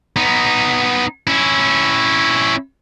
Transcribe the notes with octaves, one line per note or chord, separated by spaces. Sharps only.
B3 D#4
C#4 E4